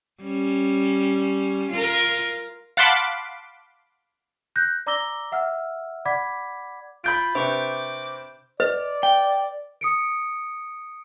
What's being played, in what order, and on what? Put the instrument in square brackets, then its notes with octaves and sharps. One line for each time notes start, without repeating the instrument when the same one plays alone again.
[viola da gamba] G3 C#4
F4 A#4
[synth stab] F5 F#5 A5 B5 C6 D6
[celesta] F#6 G6 A#6
D5 A#5 D6 E6 A#6 G7
E5 F#5 E6 F6
D5 F#5 B5 D6 G#6 B6
[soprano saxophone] F4 [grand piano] B5 G6 D7
[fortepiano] C3 D4 B4 [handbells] C5 C#6 [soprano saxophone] D6
[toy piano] B4 D#5 [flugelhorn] D5
[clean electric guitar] G5
[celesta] D#6 C#7 D7